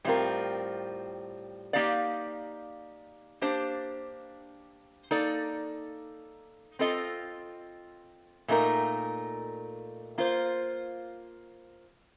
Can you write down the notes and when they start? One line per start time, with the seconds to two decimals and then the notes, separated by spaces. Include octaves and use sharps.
0.04 A2 G3 C4 F4 A#4
1.73 A#3 D#4 G4 D5 F5
3.41 A#3 D4 G4 C5
5.11 A#3 D#4 A4 D5
6.79 C4 F4 A4 D#5
8.48 A#2 A3 D#4 A#4
10.18 A#3 F4 C5